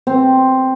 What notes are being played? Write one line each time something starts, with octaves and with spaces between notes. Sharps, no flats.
C4